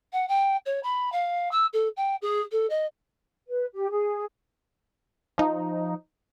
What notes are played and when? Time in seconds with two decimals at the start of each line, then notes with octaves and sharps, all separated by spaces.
0.12 F#5
0.28 G5
0.65 C#5
0.83 B5
1.12 F5
1.51 E6
1.73 A4
1.96 G5
2.21 G#4
2.51 A4
2.69 D#5
3.47 B4
3.73 G4
3.90 G#4
5.38 F3 D#4